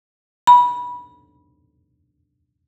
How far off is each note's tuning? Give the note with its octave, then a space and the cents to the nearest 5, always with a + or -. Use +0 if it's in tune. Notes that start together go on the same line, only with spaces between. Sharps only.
B5 -20